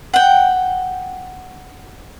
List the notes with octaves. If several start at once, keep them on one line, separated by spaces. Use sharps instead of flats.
F#5 G5